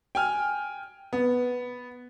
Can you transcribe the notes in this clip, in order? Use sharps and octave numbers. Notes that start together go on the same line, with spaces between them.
G5 G#5 F6
B3